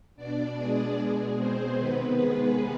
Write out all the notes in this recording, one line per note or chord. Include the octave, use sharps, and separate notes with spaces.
B2 D4 D5
G#3 G#4
B2
C4 C5
C3 D#3 B3 B4
G#3 G#4